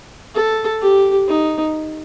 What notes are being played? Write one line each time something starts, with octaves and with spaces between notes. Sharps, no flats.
A4
G4
D#4